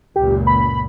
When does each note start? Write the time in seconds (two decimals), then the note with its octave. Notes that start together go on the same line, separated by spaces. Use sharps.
0.16 C#2 F#2 A#2 G4
0.47 B5